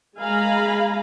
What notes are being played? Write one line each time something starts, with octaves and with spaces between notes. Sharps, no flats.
G#3 F5 G#5 A#5 B5